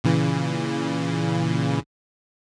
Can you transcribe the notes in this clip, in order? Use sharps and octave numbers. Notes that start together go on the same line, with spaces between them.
A#2 C#3 E3